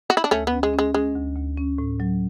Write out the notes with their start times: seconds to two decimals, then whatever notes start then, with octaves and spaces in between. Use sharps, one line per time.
0.10 F#4
0.17 E4
0.24 D4
0.31 D2 A3 C#4
0.47 B3
0.53 C#4
0.63 G#3
0.74 G#3 C#4
0.94 G#3 C#4
1.16 D2
1.36 D2
1.57 C#4
1.78 A2
2.00 F#3